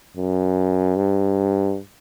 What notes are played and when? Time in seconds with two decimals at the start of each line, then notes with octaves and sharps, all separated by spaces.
0.17 F#2
0.96 G2